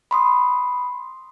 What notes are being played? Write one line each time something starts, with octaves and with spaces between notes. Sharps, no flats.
B5 C6 D#6